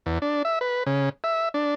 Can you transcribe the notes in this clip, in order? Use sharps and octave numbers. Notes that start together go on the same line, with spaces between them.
E2
D4
E5
B4
C#3
E5
D4